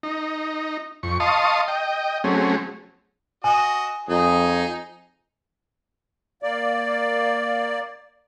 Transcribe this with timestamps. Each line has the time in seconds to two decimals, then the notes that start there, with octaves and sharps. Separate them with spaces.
0.03 D#4
1.03 F2 C#6
1.20 D#5 F5 A5 C6 C#6 D#6
1.68 D#5 G5
2.24 F#3 A3 C4 C#4 G#4
3.44 F#4 D#5 G#5
4.09 F2 D#4 G#4
6.43 A#3 D5